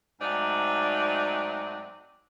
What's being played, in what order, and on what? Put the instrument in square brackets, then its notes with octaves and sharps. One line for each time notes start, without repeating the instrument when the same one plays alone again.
[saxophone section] G#2 F#3 A3 C4 D#4 D5